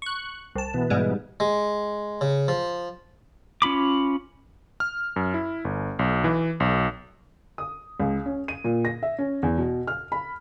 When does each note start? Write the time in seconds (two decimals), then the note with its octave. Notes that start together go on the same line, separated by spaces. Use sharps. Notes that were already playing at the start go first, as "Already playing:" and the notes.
0.02 C#6 F#6
0.55 C2 A5
0.74 B2 E3 B3
0.90 G#2 G3 G#3
1.40 G#3
2.21 C#3
2.48 F3
3.62 C#4 F4 B5 D6
4.80 F6
5.16 F#2
5.34 E4
5.65 G1
5.99 B1
6.24 E3
6.60 B1
7.58 D#6
8.00 C#2
8.26 C#4
8.48 D#7
8.64 A#2
8.85 A#6
9.03 E5
9.18 C#4
9.43 E2
9.58 B2
9.87 F6
10.12 B5